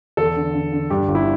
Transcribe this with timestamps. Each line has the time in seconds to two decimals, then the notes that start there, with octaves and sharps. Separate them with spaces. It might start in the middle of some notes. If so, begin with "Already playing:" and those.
0.17 E2 A4
0.36 D3
0.54 D3
0.72 D3
0.90 G2 G4
1.08 G1
1.15 E4